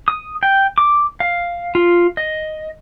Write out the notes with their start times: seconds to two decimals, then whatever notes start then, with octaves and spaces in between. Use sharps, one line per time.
0.08 D#6
0.43 G5
0.78 D6
1.20 F5
1.75 F4
2.17 D#5